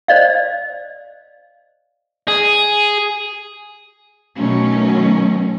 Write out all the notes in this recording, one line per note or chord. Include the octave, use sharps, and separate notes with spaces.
C5 D5 D#5 F5
G#4
B2 D#3 F#3 A3 C#4